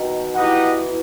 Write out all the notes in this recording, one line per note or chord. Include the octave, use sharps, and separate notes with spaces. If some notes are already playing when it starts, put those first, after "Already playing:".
Already playing: B2 D#3
E3 D#4 G4 B4 D#5 F#5
E3